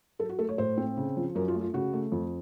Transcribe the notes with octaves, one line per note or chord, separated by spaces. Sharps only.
F#3 A4
F#4
A3 A4
C#5
A2 C5
C4
C#3
F3
F#2 A#4
F4
A3
F4
C#3 F#4
A3
F2